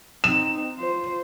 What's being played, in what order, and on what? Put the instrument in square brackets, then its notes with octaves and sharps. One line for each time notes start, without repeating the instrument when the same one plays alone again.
[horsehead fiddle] C4 D#4 [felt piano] E7
[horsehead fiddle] F4 C5